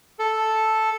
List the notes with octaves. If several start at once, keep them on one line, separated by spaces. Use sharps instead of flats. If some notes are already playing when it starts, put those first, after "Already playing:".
A4